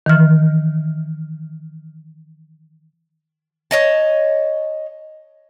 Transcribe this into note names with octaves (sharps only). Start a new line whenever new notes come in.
D#3 E3 F6
C#5 D#5 A5